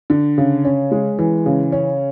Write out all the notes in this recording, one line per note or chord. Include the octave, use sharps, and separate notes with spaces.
D3
C#3
C#4
G#3
E3
C#3
C#4